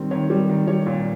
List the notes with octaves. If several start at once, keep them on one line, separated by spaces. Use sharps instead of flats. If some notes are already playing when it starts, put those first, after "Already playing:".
Already playing: D#3 G3 C4
D#3 C#5
G3
D#3
G3 C#5
A#2